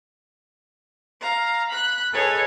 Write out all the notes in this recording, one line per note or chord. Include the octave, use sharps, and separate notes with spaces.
F5 A#5
B5 F#6
G#4 A4 B4 C#5 D#5